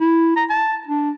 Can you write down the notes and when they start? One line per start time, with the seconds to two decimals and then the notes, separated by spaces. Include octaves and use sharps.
0.01 E4
0.36 A#5
0.50 A5
0.87 D4